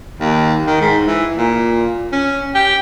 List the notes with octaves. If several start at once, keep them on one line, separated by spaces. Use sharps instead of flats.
D#2
D#3
G#2
E3
A#2
C#4
G4